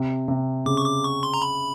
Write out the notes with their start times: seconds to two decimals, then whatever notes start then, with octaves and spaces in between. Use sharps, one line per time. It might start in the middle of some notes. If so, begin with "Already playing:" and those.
Already playing: C3
0.28 C3
0.66 C#3 D6
0.77 C#6
0.85 D6
1.04 C#6
1.23 C6
1.34 A#5
1.42 B5